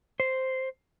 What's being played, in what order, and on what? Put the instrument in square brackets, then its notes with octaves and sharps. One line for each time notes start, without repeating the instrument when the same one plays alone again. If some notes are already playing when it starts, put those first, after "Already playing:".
[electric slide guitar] C5